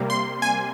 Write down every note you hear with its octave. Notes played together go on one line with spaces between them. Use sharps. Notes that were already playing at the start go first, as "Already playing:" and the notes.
Already playing: C3 G3 A#3
C6
G#5